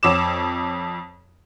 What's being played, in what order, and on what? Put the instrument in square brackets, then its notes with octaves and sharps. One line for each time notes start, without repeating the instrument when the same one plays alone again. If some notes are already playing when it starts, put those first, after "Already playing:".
[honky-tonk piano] F2 C#5 D6 E7